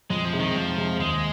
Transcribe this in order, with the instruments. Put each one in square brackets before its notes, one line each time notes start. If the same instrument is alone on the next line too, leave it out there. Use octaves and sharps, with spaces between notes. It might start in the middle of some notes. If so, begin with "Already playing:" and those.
[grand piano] F2 [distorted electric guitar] G#3
[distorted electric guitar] F3
[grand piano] C3 G#3 D#4
[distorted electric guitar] D#3
[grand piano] F2 [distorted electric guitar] F3
[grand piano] C3 G#3 D#4
[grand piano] D#2 [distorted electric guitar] G#3